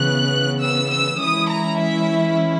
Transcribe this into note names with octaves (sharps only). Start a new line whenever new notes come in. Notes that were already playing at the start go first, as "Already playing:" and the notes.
Already playing: C#3 E3 B3 F#6
E6
E6
E3 G#3 C#4 E4 D#6
A#5
E5